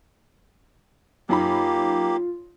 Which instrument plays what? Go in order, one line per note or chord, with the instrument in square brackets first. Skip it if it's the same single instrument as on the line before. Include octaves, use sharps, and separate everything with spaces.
[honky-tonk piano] F#2 D#4 B5 [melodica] A#3 G4 [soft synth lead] F4